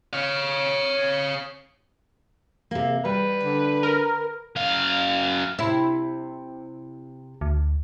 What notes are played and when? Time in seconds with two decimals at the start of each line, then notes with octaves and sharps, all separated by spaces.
0.13 C#5 F5
2.71 C3 A#3
3.05 G3 B4
3.44 D3
3.83 A#4
4.56 F#2 F5
5.59 C3 E4
7.41 D2